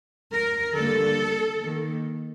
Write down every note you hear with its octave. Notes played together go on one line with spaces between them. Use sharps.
A#4
D3 G3 A#3 A4
D#3 A#3